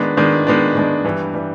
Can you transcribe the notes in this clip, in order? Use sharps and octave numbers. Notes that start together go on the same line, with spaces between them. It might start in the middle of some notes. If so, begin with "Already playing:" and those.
Already playing: D#3 G#3 B3 D4
D#3 G#3 B3 D4
D#3 G#3 B3 D4
D#3 G#3 B3 D4
G2 E3 G3
E3 G3